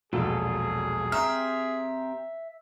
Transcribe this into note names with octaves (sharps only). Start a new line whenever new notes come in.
E1 A#1 F#3 F4 G#4 A4
C4 G4 E5 A#5 F6